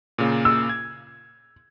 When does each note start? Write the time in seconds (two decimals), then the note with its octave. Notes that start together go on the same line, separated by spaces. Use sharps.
0.18 A#2 C#3 A#3
0.45 E6
0.69 G#6